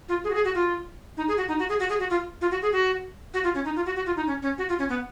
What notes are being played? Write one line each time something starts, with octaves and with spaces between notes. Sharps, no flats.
F4
G#4
F#4
G#4
F#4
F4
D#4
G#4
F#4
D#4
F#4
G#4
F#4
G#4
F#4
F4
F4
F#4
G#4
F#4
F#4
F4
C#4
D#4
F4
F#4
F#4
F4
D#4
C#4
C#4
F#4
F4
C#4
B3